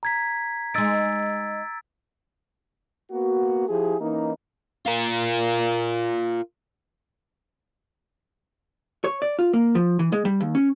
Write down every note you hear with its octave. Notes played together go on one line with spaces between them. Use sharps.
A#5 G#6 B6
G#3 D#4 E6 A6 D7
A#3 B3 F#4
F3 E4 G4 G#4
E3 A#3 C#4 D#4
F4 A#4
C#5
D5
F4
A#3
F3
E3
G#3
G3
D#2
C#4